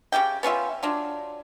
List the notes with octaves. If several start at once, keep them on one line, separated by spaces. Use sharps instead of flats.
C#3 D4 G4 G5
B3 C#4 F4 E5
F#3 D4 F4